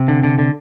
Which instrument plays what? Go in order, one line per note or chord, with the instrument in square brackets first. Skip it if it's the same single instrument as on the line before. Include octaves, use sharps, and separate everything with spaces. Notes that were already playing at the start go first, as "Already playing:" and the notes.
Already playing: [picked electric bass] C3
[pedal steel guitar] D3
D3
D3